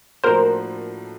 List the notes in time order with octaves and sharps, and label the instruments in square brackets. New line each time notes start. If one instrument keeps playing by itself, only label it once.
[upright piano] A2 F3 A#3 D4 F#4 [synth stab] A#4 C5